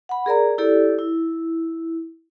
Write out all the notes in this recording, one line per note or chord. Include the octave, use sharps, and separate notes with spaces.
F#5 B5
G#4 A#4 D5 A#5
E4 G4 A4 D5
E4